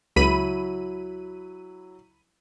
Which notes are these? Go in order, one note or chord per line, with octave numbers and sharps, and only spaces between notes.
C#2 F#3 E4 B5 D#7